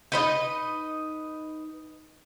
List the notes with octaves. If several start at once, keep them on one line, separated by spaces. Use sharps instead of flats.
D#4 B4 D#5